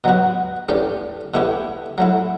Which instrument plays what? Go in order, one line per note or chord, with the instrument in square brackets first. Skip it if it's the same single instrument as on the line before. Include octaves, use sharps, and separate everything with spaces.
[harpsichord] B2 F#3 B3 F#4
E3 A3 C#4 G4 D5
B2 A3 E4 G4 C#5
F#3 A3 E4